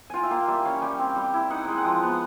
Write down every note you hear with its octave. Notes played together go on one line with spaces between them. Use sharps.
F4 G5 G#5
E5
A#3 F5
G3 E5
C#4 F5
G3 G5
C4
G3
E4
D#4 F#5
G#3 G5
F#5
F3
B3